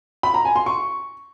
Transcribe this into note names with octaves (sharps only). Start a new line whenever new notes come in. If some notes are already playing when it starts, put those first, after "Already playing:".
B5
A#5
G#5
C6
C#6